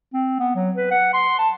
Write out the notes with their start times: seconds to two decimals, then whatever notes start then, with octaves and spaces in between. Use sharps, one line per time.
0.13 C4
0.40 B3
0.55 F#3
0.76 B4
0.91 F#5
1.14 C6
1.39 A5